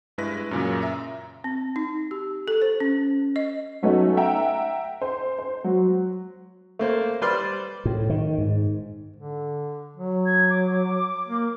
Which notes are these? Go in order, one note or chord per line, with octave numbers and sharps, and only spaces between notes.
G2 G#3 E4 B4 A#6
F#2 A#2 C#3
E5 A#5
C4
D#4
G4
A4
C5
C#4
D#5
F#3 A3 B3 C#4 D#4 D#5
E5 F#5 G5 A#5
C5
C5
F#3
A3 A#3 C5
G3 B4 C5 D5 C6 F6
A2
D#3
G#2
D3
F#3
G#6
D6
A#3